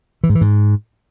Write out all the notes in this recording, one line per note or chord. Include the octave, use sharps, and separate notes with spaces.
E3
G#2
E3
G#2